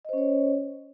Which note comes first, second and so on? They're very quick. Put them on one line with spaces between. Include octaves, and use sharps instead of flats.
D#5 C5 C#4 C#5